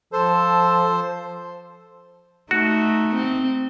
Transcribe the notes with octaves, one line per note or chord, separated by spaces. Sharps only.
F3 A4 C5
A3 D#4 F#4
C4